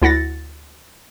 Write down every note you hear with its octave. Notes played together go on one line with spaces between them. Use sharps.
D2 E4 F#5 A6 A#6